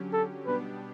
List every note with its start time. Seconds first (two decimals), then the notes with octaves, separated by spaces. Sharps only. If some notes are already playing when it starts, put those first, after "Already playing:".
Already playing: D3 F#3 C#4 G4
0.13 A4
0.46 B2 G3 B3 D4 G4 B4